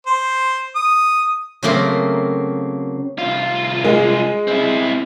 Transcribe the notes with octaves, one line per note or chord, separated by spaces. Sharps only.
C5
D#6
C#3 F#3 A3 A#3 C4 A#4
C2 F4
G#3
C4 E4